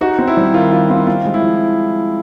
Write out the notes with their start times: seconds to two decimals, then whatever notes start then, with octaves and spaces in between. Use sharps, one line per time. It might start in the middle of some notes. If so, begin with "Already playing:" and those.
0.01 D#4 F#4
0.19 C4
0.27 E4
0.37 G3
0.54 D#3 F4
0.72 D#4 F4
0.90 C4 F4
1.07 C4 F4
1.25 G#3
1.34 E4
1.43 F3